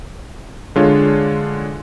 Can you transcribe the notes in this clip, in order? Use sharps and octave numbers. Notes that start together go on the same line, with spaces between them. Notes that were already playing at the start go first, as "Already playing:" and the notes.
D3 G#3 D4 F4 C#5